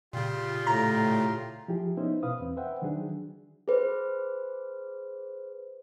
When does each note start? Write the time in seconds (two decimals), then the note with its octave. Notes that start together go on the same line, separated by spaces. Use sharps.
0.13 A#2 C#3 F4 G4 C6
0.67 A2 A#5
1.68 F3 E4 G4 G#4
1.97 B3 C#4 D#4 E4 C5
2.23 B2 B4 F5 D#6
2.40 E2 C4
2.57 B4 C5 E5 F#5 G5
2.82 D#3 F#3 D4 G#4
3.68 G#4 B4 C5